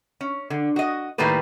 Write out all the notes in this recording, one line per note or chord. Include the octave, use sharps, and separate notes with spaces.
C#4
D3
F#4 D#5
A2 D#3 G3 A3 A#3 B4